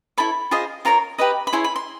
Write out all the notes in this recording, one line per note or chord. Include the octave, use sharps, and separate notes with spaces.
E4 A4 C#5 B5
F4 G#4 C5 D#5
F4 A#4 C#5 A#5
G4 B4 D#5 B5
B5
E4 G#4 C#5 C6
B5
C6